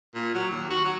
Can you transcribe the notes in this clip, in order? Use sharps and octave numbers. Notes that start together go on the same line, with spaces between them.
A#2
F#3
D#2
F#4
F#3